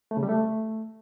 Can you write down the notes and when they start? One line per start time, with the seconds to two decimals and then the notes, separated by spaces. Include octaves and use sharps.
0.11 A3
0.17 C#3
0.23 G3
0.29 A3